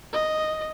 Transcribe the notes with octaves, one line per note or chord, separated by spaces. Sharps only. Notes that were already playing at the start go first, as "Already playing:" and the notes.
D#5